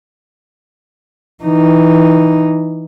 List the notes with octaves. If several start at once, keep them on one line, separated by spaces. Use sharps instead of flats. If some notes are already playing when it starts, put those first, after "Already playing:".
E3 D#4